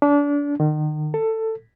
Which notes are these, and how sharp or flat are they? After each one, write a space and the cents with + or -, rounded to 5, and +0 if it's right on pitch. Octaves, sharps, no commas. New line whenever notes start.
D4 -30
D#3 -35
A4 +15